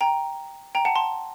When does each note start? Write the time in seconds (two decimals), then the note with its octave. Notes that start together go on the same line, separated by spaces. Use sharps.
0.01 G5 A#5
0.75 G5 A#5
0.85 F#5 A5
0.95 A5 C6